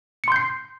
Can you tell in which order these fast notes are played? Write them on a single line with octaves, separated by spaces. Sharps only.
C#7 C6 G6 C7